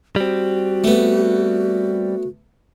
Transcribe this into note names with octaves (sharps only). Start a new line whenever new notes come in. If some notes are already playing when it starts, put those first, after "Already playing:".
G3 C4 F#4
A3 B3